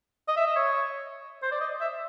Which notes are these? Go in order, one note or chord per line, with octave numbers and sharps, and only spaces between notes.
D#5
E5
D#5
C#5
C5
D5
D#5
E5